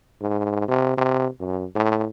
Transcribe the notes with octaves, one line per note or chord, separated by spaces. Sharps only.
G#2
C3
C3
F#2
A2